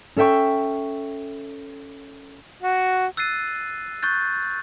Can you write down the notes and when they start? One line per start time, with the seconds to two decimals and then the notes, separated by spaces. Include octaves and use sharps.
0.16 C#4 A4 E5 G5 C#6
2.63 F#4
3.17 E6 F#6 A6 C7 D#7
4.03 C#6 F#6 G6 A6